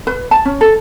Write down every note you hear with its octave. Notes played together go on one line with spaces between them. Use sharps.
B4
A5
C#4
A4